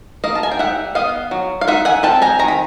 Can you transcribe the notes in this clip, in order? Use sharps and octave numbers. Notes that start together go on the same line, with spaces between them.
A#3 D#5 F5
A5
G#5
G5
G3 E5 F#5
B3 D#5 F5
F#3
F5
D#4 E5 F#5
F#5 G#5
C4 G5 A5
G#5 A#5
D#3 A#5
B5